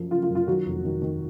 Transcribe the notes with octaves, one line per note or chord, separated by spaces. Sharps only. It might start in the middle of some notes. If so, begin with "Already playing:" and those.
Already playing: F#2 F3
C#3 F4
F4
F#2
F4
D#3 F#3 F#4
F1
D#3
D#3